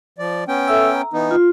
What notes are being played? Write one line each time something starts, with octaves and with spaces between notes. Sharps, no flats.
F3 D5
B3 C#4 G5
A4 E5 E6
A#5
E3 B3 D#4
F4